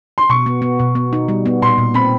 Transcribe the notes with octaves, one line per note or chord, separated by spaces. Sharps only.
C6
B2 C#6
B3
B3
B2
B3
D#4
G3
B3
A#2 C6
A#2
C4 B5